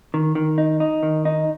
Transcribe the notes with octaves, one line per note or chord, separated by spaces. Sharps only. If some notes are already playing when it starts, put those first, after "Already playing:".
D#3
D#3
D#4
D#4
D#3
D#4